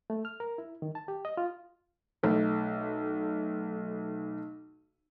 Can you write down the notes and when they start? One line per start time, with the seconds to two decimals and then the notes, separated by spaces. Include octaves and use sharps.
0.10 A3
0.25 F6
0.40 A#4
0.58 E4
0.82 D#3
0.95 A5
1.08 G4
1.25 D#5
1.37 F4
2.23 B1 A3